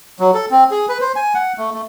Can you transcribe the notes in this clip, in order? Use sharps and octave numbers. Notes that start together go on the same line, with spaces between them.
F#3
A4
C4
G#4
B4
C5
G#5
F#5
A3
A3